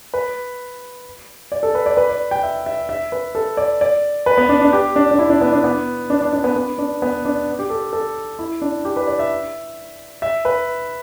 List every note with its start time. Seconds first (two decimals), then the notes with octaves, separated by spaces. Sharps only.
0.14 B4
1.52 D5
1.63 A4
1.75 B4
1.86 D5
1.97 B4
2.09 D5
2.31 G5
2.43 E5
2.66 E5
2.89 E5
3.12 B4
3.35 A4
3.57 D5
3.81 D5
4.26 B4
4.37 B3
4.49 D4
4.61 D4
4.73 G4
4.96 D4
5.11 D4
5.19 E4
5.30 D4
5.41 B3
5.52 D4
5.64 B3
6.10 D4
6.21 D4
6.33 D4
6.44 B3
6.56 B3
6.78 D4
7.02 B3
7.25 D4
7.59 G4
7.70 A4
7.93 A4
8.39 E4
8.62 D4
8.85 G4
8.96 B4
9.07 D5
9.19 E5
10.22 E5
10.45 B4